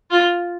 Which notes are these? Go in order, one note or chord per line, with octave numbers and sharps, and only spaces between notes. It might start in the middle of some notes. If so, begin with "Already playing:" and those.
F4